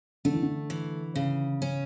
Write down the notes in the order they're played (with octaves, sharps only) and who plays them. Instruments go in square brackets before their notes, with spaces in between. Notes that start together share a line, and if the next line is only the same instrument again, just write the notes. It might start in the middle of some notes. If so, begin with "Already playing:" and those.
[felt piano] D3 [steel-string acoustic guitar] A3
[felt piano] E3
D3
[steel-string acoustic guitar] E3
C#3
C#4